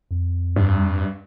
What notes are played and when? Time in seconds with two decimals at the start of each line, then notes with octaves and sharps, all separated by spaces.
0.11 F2
0.56 G2